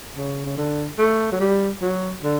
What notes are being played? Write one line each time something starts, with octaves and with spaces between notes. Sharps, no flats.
C#3
C#3
D3
A3
F#3
G3
F#3
D3